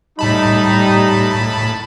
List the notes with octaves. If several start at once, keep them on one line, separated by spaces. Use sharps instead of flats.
A2 G3 D#4 A5 B5